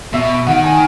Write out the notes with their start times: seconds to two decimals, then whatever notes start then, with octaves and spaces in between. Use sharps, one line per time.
0.13 B2 E5
0.47 D#3 F#5
0.64 G#5